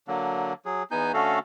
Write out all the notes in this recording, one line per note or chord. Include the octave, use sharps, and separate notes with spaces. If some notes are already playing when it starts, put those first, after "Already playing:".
D3 F#3 A#3
F#3 G#4
E2 B3 D#4 G#5 G6
D3 A3 C#4 F#4 A4 F5